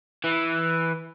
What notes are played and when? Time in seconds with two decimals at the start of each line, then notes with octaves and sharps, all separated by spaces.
0.24 E3